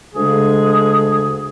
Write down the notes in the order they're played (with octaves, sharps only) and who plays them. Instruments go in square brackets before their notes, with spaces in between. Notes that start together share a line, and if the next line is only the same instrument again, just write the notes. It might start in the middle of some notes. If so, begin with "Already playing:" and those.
[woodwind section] D2 C#3 G#3 D4 G#4